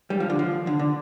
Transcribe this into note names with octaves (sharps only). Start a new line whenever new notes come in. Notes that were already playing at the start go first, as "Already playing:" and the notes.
G3
F3
D3
F3
D3
D3